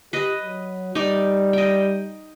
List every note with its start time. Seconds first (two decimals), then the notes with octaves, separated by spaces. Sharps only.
0.13 G4 B4 D#5
0.42 F#3
0.95 G3 D#4 D5
1.53 D#5 G5